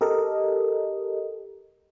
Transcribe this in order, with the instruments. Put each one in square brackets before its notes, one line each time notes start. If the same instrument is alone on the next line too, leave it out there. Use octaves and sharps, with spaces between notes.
[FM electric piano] G4 A4 A#4 D#5